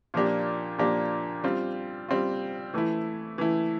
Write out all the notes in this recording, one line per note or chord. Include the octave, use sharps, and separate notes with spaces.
A#2 F3 A#3 D4 G4
A#2 F3 A#3 D4 G4
G3 C4 F4
G3 C4 F4
E3 A3 E4
E3 A3 E4